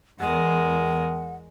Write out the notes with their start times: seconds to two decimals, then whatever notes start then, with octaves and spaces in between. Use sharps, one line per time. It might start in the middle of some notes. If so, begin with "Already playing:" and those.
0.20 E2 G#3 A#4 F#5